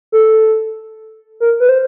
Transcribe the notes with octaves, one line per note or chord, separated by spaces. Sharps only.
A4
A#4
B4
C5